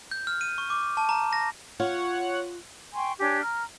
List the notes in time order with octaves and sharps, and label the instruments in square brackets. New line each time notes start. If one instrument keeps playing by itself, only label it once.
[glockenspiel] G6
F6
D#7
C#6
D6
A5
A#5
A#6
[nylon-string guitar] F4 [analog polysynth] C#5 F#5
[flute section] G5 G#5 C6 C#6
D4 G4 C#5 G#5
A#5 F6